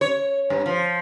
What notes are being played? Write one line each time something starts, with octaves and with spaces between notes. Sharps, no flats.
C#5
G2
F3